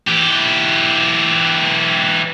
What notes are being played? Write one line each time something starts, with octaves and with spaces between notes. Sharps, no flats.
E3 G4